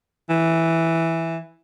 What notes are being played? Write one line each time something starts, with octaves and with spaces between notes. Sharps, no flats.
E3